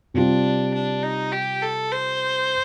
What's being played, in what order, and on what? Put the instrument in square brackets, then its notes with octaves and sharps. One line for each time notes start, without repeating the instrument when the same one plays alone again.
[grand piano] C3 G3 C4 F4 [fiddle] D4
[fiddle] D4
D#4
G4
A4
C5